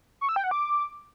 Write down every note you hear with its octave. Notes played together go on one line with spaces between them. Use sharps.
C#6
E6
G5
F#5
D6